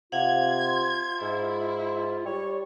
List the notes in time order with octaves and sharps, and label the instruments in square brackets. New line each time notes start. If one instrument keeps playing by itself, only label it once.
[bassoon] C3 [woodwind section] F4 [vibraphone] F5 F#5 [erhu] G#6
[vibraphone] C6
[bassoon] G#2 [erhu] E4
[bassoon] G3 [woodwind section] C#5